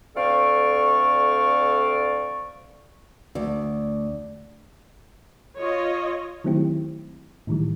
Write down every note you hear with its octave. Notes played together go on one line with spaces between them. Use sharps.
D2 C4 A4 D5 F5 C#6
D2 D5
F4 C#5 D#5
D#3 F#3 A3 C4 E4 G4
A2 D#3 E3 G3